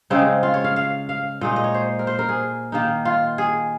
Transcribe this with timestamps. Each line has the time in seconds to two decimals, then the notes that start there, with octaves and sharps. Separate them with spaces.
0.10 C#3 G#3 C4 D#4
0.43 F4
0.54 C#5
0.64 F5
0.76 F5
1.09 F5
1.41 A#2 G#3 D#4 D#5
1.56 D#5
1.64 C#5
1.74 C5
1.99 A#4
2.07 C5
2.19 A#4
2.29 G#4
2.72 D#3 A#3 D#4
3.05 F4
3.38 G#4